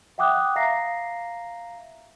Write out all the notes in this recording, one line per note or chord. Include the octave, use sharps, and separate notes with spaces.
E5 F#5 G5 D6 D#6 F#6
E5 F5 A#5 A#6 C7